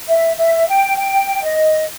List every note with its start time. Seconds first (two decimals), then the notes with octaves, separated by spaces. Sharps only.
0.07 E5
0.37 E5
0.67 G5
0.97 G5
1.42 D#5